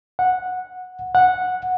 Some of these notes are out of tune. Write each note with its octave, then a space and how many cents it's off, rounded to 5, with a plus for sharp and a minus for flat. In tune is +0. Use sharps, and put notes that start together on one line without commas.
F#5 -10
F#5 -10